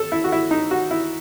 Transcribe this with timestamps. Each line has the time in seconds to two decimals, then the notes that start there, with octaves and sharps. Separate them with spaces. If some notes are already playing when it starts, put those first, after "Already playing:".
Already playing: A4
0.12 E4
0.24 F#4
0.32 E4
0.51 D#4
0.71 F#4
0.91 E4